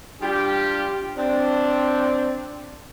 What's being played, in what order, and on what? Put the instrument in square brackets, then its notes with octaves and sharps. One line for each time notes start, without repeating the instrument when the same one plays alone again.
[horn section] G3 D4 F4 G4
C4 D4